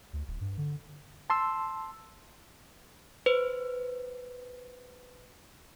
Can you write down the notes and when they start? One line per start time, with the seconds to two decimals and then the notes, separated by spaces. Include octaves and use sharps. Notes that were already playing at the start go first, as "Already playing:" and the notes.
0.13 D2
0.28 D1
0.41 G2
0.58 D3
1.30 A5 C6 E6
3.26 B4 C5